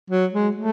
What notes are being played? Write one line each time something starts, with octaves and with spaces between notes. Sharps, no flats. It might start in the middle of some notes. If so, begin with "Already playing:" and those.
F#3
G#3
A3